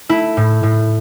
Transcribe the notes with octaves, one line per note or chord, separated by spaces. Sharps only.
A3 E4
A2
A2